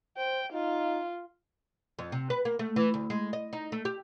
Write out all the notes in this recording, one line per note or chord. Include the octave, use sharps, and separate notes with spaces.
C5 G5
D#4 F4
F2
C3
B4
A#3
A3
E3
D2
G#3
D#5
D#4
A3
G4